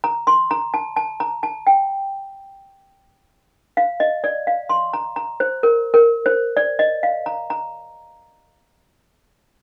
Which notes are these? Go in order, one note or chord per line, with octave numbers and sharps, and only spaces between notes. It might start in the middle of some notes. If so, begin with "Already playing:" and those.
A#5
C6
A#5
A5
A5
A#5
A5
G5
F5
D#5
D5
F5
C6
A#5
A#5
C5
A#4
A#4
C5
D5
D#5
F5
A#5
A#5